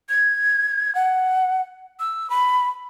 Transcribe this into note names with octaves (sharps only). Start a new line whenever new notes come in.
G#6
F#5
E6
B5